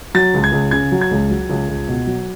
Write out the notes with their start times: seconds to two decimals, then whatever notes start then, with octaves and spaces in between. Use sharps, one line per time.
0.14 F#3 A6
0.34 C#2
0.44 G#6
0.52 C#2
0.71 C#3 G#6
0.92 F#3
1.01 G#6
1.11 C#2
1.30 F#3
1.49 C#2
1.68 C#2
1.88 B2
2.07 F#3